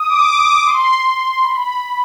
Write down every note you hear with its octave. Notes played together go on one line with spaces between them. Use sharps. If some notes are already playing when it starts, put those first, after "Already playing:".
Already playing: D#6
D6
D#6
D6
C6
B5